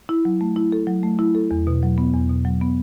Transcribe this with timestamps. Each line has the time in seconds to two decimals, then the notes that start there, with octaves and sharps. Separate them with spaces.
0.09 E4
0.25 F#3
0.41 A3
0.56 E4
0.72 A4
0.87 F#3
1.03 A3
1.19 E4
1.35 A4
1.51 E2
1.67 B2
1.83 F#3
1.98 B3
2.13 E2
2.29 B2
2.45 F#3
2.62 B3